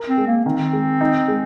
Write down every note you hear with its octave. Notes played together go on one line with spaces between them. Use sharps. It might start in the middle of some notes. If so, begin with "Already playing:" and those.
Already playing: A#4
C4
G#3
A#3
D#3 C4
G#3
D#4
G#3